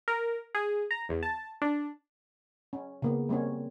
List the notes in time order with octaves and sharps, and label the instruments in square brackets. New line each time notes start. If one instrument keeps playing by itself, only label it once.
[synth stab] A#4
G#4
A#5
E2
A5
D4
[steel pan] C#4
C#3 A#3 B3
G3 A#3 C4 C#4 C#5